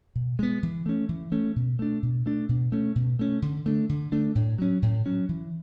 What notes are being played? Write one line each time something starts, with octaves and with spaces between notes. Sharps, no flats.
B2
G#3 B3
E3
A3 C#4
E3
A3 C#4
B2
A3 D4
B2
A3 D4
B2
A3 C#4
B2
A3 C#4
D3
A3 D4
D3
A3 D4
A2
F#3 C#4
A2
F#3 C#4
E3